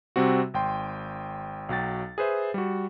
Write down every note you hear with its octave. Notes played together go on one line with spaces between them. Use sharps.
C3 G3 C4 F#4
G#1 G5 C6
B1 F#3 G5 A6
G#4 B4 C5 E5
G3 F#4